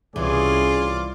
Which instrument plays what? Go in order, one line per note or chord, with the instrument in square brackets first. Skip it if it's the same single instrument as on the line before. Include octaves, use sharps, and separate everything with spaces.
[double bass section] C2 [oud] E3 [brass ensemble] C#4 G#4 [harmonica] F4 D5